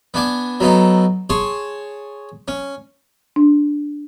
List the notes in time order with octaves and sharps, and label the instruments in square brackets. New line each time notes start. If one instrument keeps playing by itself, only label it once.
[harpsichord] B3 D4 G#5 D6
F#3 B3 D#4 A4
G#4 C#5 A5 C6
C#4
[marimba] D4